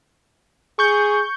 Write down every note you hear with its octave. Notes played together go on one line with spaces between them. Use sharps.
G#4 C#6 G6